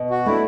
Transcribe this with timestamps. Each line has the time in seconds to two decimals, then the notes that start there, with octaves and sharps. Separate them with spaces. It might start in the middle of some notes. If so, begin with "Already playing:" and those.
Already playing: B2
0.11 F#4
0.26 A3 D4 E4